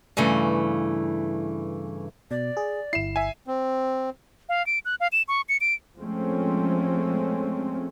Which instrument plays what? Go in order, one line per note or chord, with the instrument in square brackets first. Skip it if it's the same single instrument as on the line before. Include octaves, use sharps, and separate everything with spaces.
[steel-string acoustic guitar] G2 C#3 E3 A3
[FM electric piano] B2 [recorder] D5
[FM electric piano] G#4
[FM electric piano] G1 E4 [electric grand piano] C7 E7
[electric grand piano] E5 G#5
[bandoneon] C4
[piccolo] F5
D7
F#6
F5
E7
C#6
C#7
D7
[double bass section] F3 G#3 A3 C4 C#4